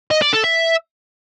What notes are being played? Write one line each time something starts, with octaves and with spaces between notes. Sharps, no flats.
D#5
D5
A4
E5